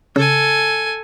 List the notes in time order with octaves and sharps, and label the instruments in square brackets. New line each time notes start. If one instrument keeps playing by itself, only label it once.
[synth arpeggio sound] C#3 [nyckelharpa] A4 G#5